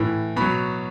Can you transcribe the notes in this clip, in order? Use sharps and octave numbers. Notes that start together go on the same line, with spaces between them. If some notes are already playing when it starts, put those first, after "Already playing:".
Already playing: A2 E3
B2 F#3 B5